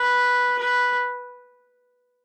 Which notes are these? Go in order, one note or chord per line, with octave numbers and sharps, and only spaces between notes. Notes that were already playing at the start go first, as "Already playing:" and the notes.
Already playing: B4
B4